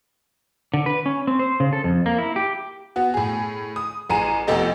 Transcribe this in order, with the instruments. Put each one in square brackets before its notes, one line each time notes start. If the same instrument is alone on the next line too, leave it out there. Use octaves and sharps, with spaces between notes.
[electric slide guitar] D3
B4
C#4
C4
C5
C#3
A4
F2
A#3
E4
G4
[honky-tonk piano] B3 F#4
A2 G#4
D#6
A1 G#4 A#5 D#7
F1 B3 G4 A4 D#5